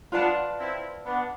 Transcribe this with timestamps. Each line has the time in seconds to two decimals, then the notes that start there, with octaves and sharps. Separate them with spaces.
0.12 B3 D4 F4 B4 D5 A5
0.58 C4 E4
1.05 B3 D4